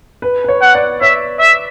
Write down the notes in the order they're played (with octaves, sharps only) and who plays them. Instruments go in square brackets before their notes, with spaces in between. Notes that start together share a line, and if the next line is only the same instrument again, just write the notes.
[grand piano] B4
B4
C#5
[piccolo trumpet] F#5
[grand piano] D5
[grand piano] C#5 [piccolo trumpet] E5
[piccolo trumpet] E5